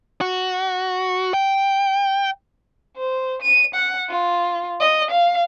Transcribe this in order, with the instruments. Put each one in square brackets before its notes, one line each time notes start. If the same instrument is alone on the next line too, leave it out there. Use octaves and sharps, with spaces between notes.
[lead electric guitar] F#4
G5
[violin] C5
D#7
F#5
F4
D#5
F5